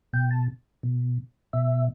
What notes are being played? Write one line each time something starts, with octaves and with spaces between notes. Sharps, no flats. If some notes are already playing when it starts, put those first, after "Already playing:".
B2 G5
A5
B2
B2 E5